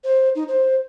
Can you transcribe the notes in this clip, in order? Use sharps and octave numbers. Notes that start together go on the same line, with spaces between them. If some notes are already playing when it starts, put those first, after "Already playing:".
C5
D#4
C5